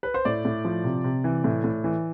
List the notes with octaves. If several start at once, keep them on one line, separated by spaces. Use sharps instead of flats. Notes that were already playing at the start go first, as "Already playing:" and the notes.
B4
C5
A2 D5
A2
F3
C3
C3
E3
A2
A2
E3